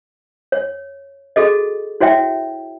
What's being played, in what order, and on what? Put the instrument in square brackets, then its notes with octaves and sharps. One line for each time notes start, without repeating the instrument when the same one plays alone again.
[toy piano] C#5
F#4 G#4 A4 D#5
E4 F#4 C#5 E5 G5